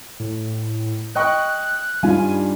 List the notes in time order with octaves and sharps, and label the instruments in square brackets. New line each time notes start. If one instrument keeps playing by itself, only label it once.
[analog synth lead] A2
[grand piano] D#5 G5 C#6 [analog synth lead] F#6
[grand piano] G2 F4 [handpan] G3 D4 D#4 [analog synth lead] G#5